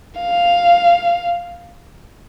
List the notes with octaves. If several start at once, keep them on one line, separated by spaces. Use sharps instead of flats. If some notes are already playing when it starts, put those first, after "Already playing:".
F5